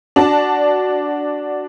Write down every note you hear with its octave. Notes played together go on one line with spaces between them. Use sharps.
D4 F#4 D5 A5